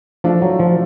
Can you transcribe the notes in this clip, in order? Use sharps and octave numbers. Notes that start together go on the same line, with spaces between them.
E3 F3 A3 D4 F4
F#3
F3